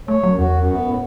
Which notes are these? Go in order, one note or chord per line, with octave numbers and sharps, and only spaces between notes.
A3 C#5
F#2 F#3
E2 F#4
F#2
B3
A2